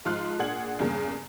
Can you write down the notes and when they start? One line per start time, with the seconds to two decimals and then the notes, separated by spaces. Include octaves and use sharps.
0.05 G#2 F3 F4 C6 F6 F#6
0.39 A#2 D4 G#4 F#5 G#6 F#7
0.79 E2 G2 C#3 A#3